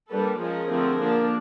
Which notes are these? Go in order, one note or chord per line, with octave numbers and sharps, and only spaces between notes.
G3 A#3 D4 A4 B4
F3 G#3 C#4 G#4 A#4
D3 F3 A3 C4
F3 A#3 D4